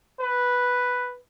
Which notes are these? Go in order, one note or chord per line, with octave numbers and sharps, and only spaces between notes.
B4